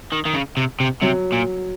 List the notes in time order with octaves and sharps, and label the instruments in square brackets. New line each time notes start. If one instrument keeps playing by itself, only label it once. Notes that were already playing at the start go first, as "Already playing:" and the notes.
[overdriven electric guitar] D#3
D#3
C#3
C3
C3
[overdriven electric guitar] C3 [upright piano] F#3
[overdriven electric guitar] A#2